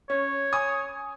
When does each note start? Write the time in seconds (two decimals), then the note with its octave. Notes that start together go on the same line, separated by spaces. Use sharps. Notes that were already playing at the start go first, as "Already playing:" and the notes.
0.10 C#4 C#5
0.53 G#5 D#6